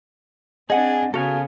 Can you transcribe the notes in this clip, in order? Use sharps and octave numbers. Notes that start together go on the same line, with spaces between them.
C4 D4 G#4 D#5 F#5 G#5
C#3 B3 F#4 A4 F5 G#5